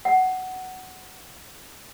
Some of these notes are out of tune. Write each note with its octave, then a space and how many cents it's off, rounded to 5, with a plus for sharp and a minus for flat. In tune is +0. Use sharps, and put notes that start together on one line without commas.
F#5 +10